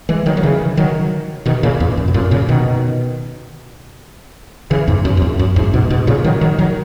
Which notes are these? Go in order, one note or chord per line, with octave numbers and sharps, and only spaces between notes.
E3 G#3
D#3 F#3
F#3
C#3 E3
D#3 F#3
B2 D#3
A#2 C#3
E2
F#2
B2
F#2 A#2
A#2 C#3
B2 D#3
C#3 E3
E2 G#2
F#2
F#2
E2
F#2
E2 G#2
G#2 B2
G#2 B2
A#2 C#3
D#3 F#3
D#3 F#3
D#3 F#3